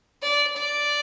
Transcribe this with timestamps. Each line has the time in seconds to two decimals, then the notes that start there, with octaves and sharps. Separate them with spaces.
0.22 D5
0.56 D5